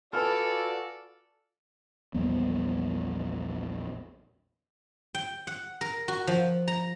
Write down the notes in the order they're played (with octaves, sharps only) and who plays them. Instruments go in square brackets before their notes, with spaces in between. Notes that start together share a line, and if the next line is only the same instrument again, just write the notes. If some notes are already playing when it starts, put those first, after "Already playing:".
[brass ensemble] F4 F#4 D5 [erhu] A4 [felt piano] B4 G#5 F6
[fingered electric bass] A#1 E2 G3 B3
[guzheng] G5
F#5
A#4
F#4
F3
A#5